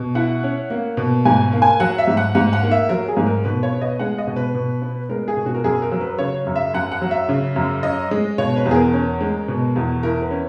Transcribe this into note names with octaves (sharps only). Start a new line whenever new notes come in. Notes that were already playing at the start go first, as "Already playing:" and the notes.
Already playing: B2
E4 F#5
C#4
A#3
B2
G#2 G#5
A#3
G#5
F#3 F#5
E5
G#2
F#5
G#2 F#5
F#5
A#3
E5
F#3 A#4
G#4
G#2
A#4
B2 B4
C#5
B3
D#5
G#3 F#5
D#5
B2
B4
B2
B3
G#3 A#4
G#4
B2
F#4
A#4
F#2 G#4
A#4
F#3
B4
C#3 C#5
F#2
E5
F#2 F#5
F#5
F#3
E5
C#3
F#2
C#4 D#5
G#3
B2 C#5
B4
E2
G#4
A#4
C#4
G#3
B2
E2
E4 A#4
B4
C#4